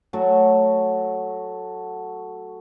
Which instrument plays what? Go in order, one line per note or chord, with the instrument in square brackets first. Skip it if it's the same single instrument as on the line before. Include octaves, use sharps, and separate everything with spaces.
[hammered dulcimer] F#3 A3 F#4